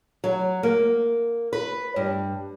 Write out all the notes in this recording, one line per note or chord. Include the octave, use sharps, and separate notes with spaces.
F#3
A#3
B4
G2